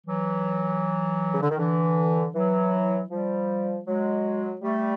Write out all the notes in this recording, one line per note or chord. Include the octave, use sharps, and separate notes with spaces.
E3 F#3
C#3
D3
D#3
D3 E3
E3 F#3
F3 G3
F#3 G#3
G3 A3